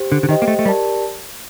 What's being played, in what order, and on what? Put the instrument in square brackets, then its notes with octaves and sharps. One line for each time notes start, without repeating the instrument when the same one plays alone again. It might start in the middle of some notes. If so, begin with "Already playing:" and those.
Already playing: [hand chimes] G4 C5
[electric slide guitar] D3
D3
[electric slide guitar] D#3 [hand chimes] G4 C5 D#5 G5
[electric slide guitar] A#3
A3
A3
[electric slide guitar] G3 [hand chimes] G4 A#4 D5 A5